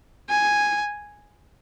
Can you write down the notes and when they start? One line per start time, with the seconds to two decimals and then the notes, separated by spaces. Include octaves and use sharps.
0.29 G#5